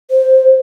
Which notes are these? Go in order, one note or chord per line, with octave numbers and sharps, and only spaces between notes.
C5